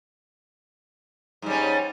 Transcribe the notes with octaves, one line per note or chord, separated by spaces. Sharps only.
G#2 G3 C#4